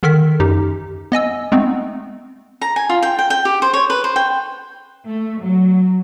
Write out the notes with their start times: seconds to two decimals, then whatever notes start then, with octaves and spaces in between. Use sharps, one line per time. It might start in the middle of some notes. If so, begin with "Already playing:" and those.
0.03 D3 D#3 A4 A#4 F6 B6
0.40 F#2 D#4 G4
1.12 B3 D#5 G#5 E6
1.52 G#3 A3 B3 C4 D#4
2.61 A#5
2.76 G#5
2.89 F4
3.02 G5
3.19 G5
3.30 G5
3.45 G4
3.62 C5
3.73 C#5
3.90 B4
4.04 C5
4.16 G5
5.07 A3
5.42 F#3